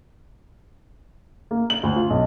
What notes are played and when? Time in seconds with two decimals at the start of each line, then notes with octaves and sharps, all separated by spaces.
1.51 A#3
1.70 F#7
1.83 D2
1.96 F4
2.10 B1